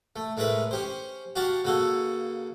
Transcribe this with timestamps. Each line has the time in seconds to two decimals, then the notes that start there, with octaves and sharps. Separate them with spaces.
0.16 A3
0.37 A2 G#3 A3 A#4 B4
0.71 C#4 G4 C5
1.36 F#4 G4 F5 F#5 A5
1.65 C#3 A#3 F#4 A4